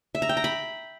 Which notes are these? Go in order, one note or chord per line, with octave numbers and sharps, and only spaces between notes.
E5
A#5
G5
A#5
B5